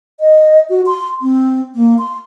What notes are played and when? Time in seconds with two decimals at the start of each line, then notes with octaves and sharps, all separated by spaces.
0.20 D#5
0.69 F#4
0.86 C6
1.21 C4
1.75 A#3
1.99 C6